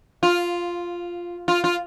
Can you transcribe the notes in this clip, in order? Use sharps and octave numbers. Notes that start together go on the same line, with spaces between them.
F4
F4
F4